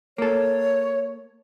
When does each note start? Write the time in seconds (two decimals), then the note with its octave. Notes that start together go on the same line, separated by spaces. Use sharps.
0.18 A#3 A4 C#5